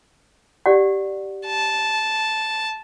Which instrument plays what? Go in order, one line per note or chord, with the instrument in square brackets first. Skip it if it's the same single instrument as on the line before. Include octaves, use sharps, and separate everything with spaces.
[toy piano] G4 D5 F#5
[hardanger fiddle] A5